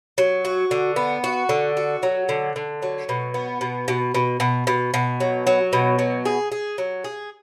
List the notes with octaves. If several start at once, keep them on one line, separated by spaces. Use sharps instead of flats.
F#3
F#4
D3
B3
F#4
D3
F#4
F#3
D3
D3
F#3
B2
B3
B2
B2
B2
B2
B2
B2
F#3
F#3
B2
F#3
G#4
G#4
F#3
G#4